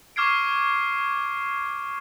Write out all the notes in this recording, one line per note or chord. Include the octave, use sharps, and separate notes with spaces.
C#6 D6 F6 G#6 C7 D7